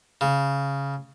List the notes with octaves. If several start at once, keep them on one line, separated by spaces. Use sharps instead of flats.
C#3